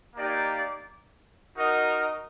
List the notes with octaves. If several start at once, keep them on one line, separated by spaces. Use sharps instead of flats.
A#3 D#4 G4 D5
D#4 F#4 A#4 D#5